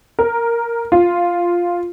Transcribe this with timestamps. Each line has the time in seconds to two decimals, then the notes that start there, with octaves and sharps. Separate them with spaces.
0.19 A#4
0.92 F4